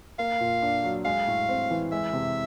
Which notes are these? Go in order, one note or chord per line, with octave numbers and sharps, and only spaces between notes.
A#3 F5
A#2
D4
F#3
G#3 F5
A2
C4
E3
G#3 E5
C3